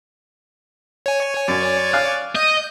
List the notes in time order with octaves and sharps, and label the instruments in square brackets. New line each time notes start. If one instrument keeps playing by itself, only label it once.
[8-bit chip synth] C#5 G#5
[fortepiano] F#2 [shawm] D5
[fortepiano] F5 F#6
[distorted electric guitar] D#5 [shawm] D#6 [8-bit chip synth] G6